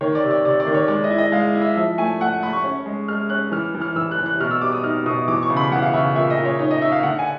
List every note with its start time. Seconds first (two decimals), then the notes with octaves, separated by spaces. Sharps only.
0.01 D#3 C#5
0.15 D5
0.23 C3
0.30 D5
0.45 C3 D5
0.60 D5
0.67 D#3
0.74 C#5
0.88 G#3 D5
1.04 D#5
1.10 E4
1.18 D#5
1.32 G#3 F5
1.54 E4
1.61 E5
1.76 F3 E5
1.98 A3 G#5
2.20 A3 F#5
2.42 A3 B5
2.53 C#6
2.64 C#4
2.86 G#3
3.08 G#3 F6
3.30 C#4 F#6
3.52 E3 F6
3.75 E3
3.82 F6
3.96 E3 E6
4.11 F#6
4.18 E3
4.26 F#6
4.40 B2 F6
4.51 E6
4.61 G3 D6
4.73 D#6
4.83 D#4 F6
5.06 B2 D#6
5.28 E3 D6
5.43 C#6
5.50 C#3
5.57 B5
5.72 E3 F#5
5.82 F5
5.93 C#3 E5
6.15 A#2 E5
6.30 D#5
6.37 A#2
6.45 C#5
6.59 D#4 C#5
6.71 D#5
6.81 D#4 E5
6.92 F5
7.03 D3 F#5
7.19 G#5